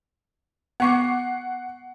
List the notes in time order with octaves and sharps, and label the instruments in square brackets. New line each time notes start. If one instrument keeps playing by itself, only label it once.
[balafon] B3 C#6 D6 [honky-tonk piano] F#5 C7 C#7